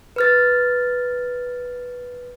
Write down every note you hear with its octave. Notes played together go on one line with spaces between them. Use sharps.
B4 F6 A6